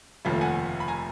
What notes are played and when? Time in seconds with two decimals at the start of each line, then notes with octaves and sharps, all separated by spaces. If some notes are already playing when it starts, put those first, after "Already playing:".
0.25 F1 D#2 C#3 F3 A3
0.41 F#5 G#5
0.80 B5
0.88 G#5 A#5